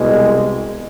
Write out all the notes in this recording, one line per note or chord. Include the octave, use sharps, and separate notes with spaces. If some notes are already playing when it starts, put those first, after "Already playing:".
Already playing: C2 B2 G#3